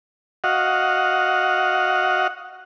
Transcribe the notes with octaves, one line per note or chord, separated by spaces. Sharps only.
F#4 D#5 F5 F#5